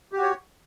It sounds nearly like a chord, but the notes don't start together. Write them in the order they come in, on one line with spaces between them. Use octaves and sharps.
G4 F#4 C#5